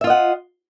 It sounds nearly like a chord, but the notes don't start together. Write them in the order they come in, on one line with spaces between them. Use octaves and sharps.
E5 F4 D#5 F#5